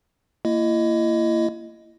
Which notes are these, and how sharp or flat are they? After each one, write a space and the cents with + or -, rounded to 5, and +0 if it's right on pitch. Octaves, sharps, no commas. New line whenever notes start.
A#3 -20 E4 +30 D#5 +0